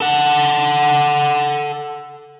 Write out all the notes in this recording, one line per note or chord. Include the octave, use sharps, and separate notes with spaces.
A4 F#5